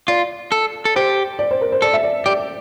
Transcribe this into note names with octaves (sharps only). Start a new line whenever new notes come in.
F4 D5
A4
A4
G4 C5
D5
C5
A#4
C5
A4 D5
E5
D5
G4 D5